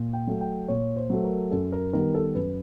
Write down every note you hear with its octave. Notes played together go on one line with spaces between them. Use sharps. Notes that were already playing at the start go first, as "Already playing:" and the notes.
Already playing: A#2
G5
F#3 A3
G5
A#2 C#5
C5
F#3 A3
A#4
F#2 A4
A#4
D#3 G3 B3 A#4
A4
F#2 B4